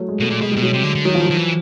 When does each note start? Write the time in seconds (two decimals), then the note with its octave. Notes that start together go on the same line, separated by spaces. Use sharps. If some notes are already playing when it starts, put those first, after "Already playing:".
Already playing: F#3 A3
0.08 G#3
0.19 B2 A3
0.31 A#2
0.41 B2 G#3
0.51 G3
0.56 B2
0.63 F#3
0.73 C3
0.84 D3
0.95 D3
1.05 D#3 F#3
1.15 F3
1.24 F#3
1.30 D#3
1.37 E3